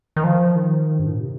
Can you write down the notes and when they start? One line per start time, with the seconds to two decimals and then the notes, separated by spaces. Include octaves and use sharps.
0.16 D#3
0.24 F3
0.56 D#3
0.99 G2
1.06 A2
1.12 A#2
1.20 C3